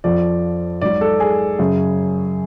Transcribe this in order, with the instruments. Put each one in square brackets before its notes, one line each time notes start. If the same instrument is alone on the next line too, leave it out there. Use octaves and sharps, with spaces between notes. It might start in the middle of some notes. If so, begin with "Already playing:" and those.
[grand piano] F2 F3 D5
G#2 F#3 D5
A4
G#4
F#2 C#3 F#3